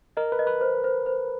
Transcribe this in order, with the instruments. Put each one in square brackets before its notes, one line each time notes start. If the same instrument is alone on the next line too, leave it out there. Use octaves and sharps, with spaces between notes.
[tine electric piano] A#4 [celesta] D#5
[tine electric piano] B4
[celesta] D#5
[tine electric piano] B4
[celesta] C5
C5
C5